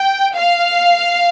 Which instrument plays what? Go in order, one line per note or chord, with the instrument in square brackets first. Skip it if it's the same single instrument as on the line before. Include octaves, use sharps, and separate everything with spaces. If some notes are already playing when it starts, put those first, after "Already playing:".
Already playing: [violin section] G5
F5